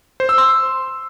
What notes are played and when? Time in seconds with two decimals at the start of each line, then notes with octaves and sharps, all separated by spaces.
0.20 C5
0.29 E6
0.38 C6